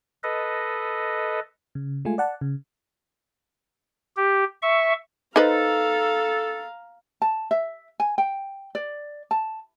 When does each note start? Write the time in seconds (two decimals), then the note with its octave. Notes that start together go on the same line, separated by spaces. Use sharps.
0.23 A4 B4 D#5
1.75 C#3
2.05 G#3 A3 F4 G#5
2.18 D5 F#5 A5
2.41 C#3
4.16 G4
4.62 E5 C#6
5.36 D#4 A4 B4 C5 F5 A#5
7.22 A5
7.51 E5
8.00 G#5
8.18 G5
8.75 D5
9.31 A5